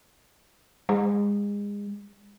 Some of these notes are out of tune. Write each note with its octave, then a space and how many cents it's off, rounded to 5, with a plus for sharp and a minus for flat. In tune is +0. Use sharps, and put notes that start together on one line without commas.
G#3 -30